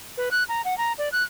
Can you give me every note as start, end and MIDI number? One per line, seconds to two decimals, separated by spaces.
0.17 0.29 71
0.31 0.44 90
0.49 0.62 82
0.65 0.77 78
0.78 0.93 82
0.98 1.09 74
1.12 1.23 90